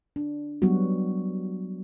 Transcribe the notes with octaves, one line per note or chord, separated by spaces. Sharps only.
D4
F#3 G3 B3 F#4